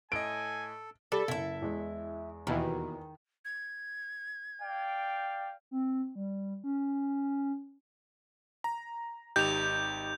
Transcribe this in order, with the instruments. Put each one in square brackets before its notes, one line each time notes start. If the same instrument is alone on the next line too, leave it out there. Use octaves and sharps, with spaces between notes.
[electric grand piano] A2 D#5 [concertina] A4 [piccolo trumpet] G#5 [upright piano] D7
[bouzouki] G3 [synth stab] A4
[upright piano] F#1 [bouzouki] E4 E5
[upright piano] E2 G#3
[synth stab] D#2 B2 E3 [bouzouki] D#3
[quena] G#6
[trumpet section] D5 F5 G5
[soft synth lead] C4
G3
C#4
[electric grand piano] A#5
[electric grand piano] G#1 D#4 G4 [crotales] G6 F7